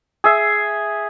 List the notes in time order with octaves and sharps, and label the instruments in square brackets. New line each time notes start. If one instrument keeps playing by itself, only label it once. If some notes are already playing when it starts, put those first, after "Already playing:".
[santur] G#4 E5